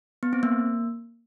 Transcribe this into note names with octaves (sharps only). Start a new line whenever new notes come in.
B3
C4
A#3